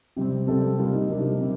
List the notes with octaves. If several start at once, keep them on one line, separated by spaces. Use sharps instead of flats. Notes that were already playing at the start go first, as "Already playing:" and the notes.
C3 G3 C4 G4
C3 G3 C4 A4
C3 G3 A#3 F4
D#4
C3 G3 A#3 D4
D#4
C3 G3